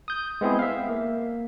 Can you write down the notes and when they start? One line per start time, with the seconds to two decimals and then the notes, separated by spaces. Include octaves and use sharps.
0.08 D#6 G6
0.41 G#3 B3 C4 E4 G#4
0.59 E5 F5
0.89 A#3